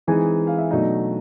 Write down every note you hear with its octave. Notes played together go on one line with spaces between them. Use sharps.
E3 G#3 C4 D#4 G#4 G#5
F5
E5
B2 F#3 A3 D4 D#4 D#5